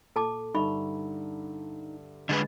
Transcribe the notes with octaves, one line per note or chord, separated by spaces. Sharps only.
A#2 A4 A5 D6
G2 D3 D#4 E5 B5 C#6
D3 G#3 B4 D#5